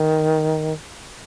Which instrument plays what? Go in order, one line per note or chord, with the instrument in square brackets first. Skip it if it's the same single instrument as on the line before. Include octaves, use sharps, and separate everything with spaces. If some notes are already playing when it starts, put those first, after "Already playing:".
Already playing: [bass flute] D#3